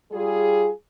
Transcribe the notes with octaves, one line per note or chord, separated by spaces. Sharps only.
G3 F4 G#4